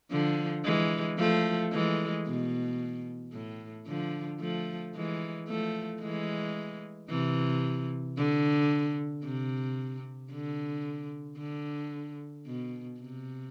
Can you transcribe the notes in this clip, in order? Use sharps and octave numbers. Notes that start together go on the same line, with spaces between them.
D3 F3
E3 G#3
F3 A3
E3 G#3
B2
A2
D3 F3
F3 A3
E3 G#3
F3 A3
E3 G#3
C3 E3
D3
C3
D3
D3
B2
C3